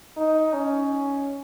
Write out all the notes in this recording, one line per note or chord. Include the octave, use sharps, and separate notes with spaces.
D#4
C#4